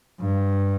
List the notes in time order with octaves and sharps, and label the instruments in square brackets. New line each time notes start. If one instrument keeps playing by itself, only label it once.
[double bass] G2